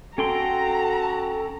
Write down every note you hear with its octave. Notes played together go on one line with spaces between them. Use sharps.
C#4 F#4 A4 G5 A#5 C6